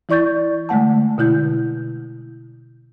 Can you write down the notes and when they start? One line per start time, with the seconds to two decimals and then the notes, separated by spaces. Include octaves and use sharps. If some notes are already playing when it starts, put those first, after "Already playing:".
0.09 E3 E4 D5 C#6 G6 A6
0.69 D3 G#3 A3 F#5 A5
1.18 B2 D3 E4 G6